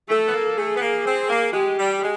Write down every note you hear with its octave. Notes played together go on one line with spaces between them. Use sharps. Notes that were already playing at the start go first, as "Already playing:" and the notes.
A3 A4
B3
A#3
A3 G#4
B3
A#3
C4
A#3
G#3 G4
G3
G#3